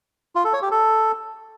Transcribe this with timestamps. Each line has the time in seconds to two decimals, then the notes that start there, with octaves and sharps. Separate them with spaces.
0.36 F4
0.44 A4
0.53 C#5
0.62 G4
0.71 A4